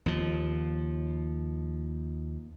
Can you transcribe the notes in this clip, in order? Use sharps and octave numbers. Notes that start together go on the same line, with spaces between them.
D#2 F3